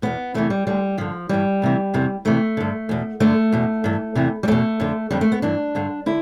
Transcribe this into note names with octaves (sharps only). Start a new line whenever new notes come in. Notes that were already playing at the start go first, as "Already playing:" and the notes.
E2 B2 B3
E2 C3 E3 A3
G3
D2 D3 G3
G2 D3 F3
G2 E3 G3
D2 C3 E3
E2 C3 E3
D2 C3 E3 A3
G2 D3
E2 B2
G2 D3 A3
E2 B2
G2 E3
E2 C3 E3
G3
E2 B2 A3
F2 D3
F2 D3 G3
A3
B3
G2 E3 D4
G2 D3
D3 E4